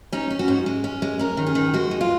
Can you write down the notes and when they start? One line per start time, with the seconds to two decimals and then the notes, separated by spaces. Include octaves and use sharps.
0.12 C#4 D#4
0.30 C#4
0.39 F#4
0.48 G#2
0.66 G#3
0.84 C#4
1.02 G#3
1.19 C#4 A#4
1.37 D#3
1.47 G#4
1.55 D#3
1.74 G#3 F#4
1.91 G#3
2.01 F4